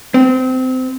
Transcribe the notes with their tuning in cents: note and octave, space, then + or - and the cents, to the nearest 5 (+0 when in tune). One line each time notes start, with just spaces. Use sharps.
C4 -25